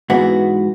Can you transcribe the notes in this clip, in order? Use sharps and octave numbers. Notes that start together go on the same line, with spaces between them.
G#2 E3 B3 F#4